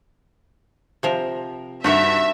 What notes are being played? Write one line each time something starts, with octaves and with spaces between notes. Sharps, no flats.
C3 F3 A#4
G2 D#4 F#4 A#4 E5